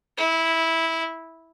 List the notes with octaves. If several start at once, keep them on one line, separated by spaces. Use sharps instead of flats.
E4